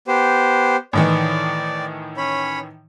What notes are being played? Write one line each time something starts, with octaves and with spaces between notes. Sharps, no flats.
B3 G4 C5
A2 D#3 E3 D5
C#4 C#5 B5